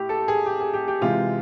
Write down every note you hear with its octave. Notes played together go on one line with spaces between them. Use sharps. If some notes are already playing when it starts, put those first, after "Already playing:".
Already playing: A2 G4
A4
G#4
G4
G#4
G4
G4
C3 E3 G#3 F4